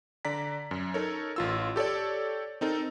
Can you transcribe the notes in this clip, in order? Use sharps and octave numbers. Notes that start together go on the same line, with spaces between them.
D3 D5 A#5 B6
F#2
D#4 A4 A#4 C#5
A1 F4 E6
G4 A4 C#5 D5
C4 D#4 A4 A#4